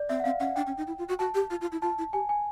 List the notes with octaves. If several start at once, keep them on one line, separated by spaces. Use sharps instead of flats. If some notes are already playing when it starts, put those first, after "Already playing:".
Already playing: D5
C4 E5
F#5
C4 F5
C#4 F#5
D4 G5
C#4
D#4
E4
F4
F#4
F#4 A5
G4
F4
F4
E4
F4 A5
E4
G4 G#5
G#5